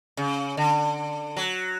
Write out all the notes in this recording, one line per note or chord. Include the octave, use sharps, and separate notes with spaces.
C#3
D3
F#3